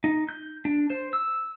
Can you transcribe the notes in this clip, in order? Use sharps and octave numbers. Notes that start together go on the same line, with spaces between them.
D#4
G6
D4
C5
E6